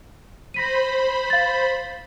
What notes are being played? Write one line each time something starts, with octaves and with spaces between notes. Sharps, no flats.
C5 B5 A#6 B6 D#7
F5 A6